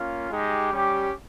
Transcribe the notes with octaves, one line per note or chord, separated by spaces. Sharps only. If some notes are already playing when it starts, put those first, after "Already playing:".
Already playing: A#3 C#4 F4
G#3 D#4 G4
G3 C#4 G4